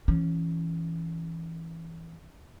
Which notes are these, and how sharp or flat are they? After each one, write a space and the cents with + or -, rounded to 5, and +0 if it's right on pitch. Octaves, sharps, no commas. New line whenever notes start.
E3 +0 C#4 +0